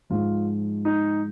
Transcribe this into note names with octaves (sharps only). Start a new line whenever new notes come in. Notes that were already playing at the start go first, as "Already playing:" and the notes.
G#2 F3 G#3 F4
D#4